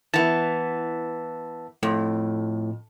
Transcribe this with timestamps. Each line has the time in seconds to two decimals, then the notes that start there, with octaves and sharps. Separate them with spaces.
0.14 E3 B3 A5
1.83 F2 A2